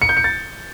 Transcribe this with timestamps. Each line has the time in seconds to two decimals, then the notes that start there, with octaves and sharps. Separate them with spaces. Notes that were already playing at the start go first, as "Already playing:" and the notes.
0.02 C#7
0.09 G6
0.17 C#7
0.24 A6